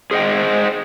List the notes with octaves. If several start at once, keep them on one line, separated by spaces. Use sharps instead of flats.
G#4 C5 D#5 G5